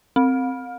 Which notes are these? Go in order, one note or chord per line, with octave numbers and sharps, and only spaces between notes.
C4